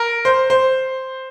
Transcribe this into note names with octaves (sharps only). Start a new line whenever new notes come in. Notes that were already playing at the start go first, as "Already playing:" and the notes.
Already playing: A#4
C5
C5